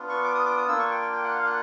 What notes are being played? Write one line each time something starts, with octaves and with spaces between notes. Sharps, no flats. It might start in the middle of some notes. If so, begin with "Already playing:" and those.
Already playing: B3 D4 F4
C#6
D6
D#6
D6
D#6
A#3 D4 F4 E6
C#6
G5
G5
G5
F#5
F5
F#5